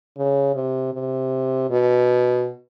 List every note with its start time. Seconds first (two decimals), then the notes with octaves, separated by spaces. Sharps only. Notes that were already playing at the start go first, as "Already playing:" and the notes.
0.17 C#3
0.55 C3
0.93 C3
1.70 B2